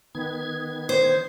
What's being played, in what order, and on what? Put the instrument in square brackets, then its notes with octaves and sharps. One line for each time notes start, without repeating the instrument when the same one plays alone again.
[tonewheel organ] D#3 B3 G#6
[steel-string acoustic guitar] C5